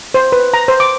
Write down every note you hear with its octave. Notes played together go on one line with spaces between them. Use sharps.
C5
B4
A#5
C5
D6